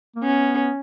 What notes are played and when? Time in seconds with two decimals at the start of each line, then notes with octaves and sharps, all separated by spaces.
0.16 A#3
0.24 B3 C#4